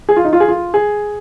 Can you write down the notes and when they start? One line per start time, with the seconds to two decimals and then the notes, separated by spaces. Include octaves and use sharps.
0.09 G#4
0.16 F4
0.25 D#4
0.33 F4
0.40 G#4
0.48 F4
0.74 G#4